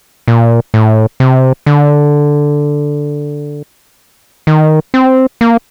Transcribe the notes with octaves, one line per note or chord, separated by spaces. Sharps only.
A#2
A2
C3
D3
D#3
C4
A#3